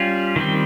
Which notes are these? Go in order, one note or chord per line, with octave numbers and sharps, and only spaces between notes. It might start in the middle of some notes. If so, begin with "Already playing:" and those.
Already playing: G3 C#4 F4
D#3 G3 C4